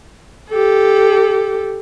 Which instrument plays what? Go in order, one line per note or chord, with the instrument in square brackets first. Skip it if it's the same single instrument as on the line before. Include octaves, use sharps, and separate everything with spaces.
[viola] G4 A4